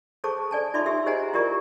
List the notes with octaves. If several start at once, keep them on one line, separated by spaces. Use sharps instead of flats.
G#4 A4 C5 A5 C#6 D6
A4 D5 G#5 A5
D#4 F4 D5 E5 C6 D6
G4 E5 E6
G#4 C5 D#5 F#5 G#5 A#5
E4 F4 G4 A#4 D5 C#6